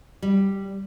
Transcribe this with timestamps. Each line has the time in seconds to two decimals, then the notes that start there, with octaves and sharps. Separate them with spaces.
0.22 G3